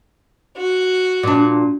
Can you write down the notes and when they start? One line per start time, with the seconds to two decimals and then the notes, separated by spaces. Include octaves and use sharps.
0.56 F#4
1.23 A#2 D4